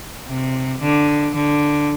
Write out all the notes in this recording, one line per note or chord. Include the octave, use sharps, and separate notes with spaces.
C3
D3
D3